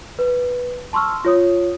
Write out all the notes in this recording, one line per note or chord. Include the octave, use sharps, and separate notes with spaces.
B4
A5 C6 C#6 E6 F6
F4 C#5 D#6